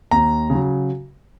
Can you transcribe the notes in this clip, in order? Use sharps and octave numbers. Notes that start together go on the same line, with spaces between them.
D#2 A#5
C#3
F#3